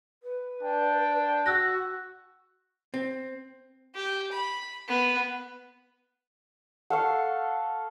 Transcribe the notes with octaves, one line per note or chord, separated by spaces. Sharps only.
B4
D4 G5
F#4 E6 F#6 A#6
C4
G4
B5
B3
A4 F5 F#5 C#6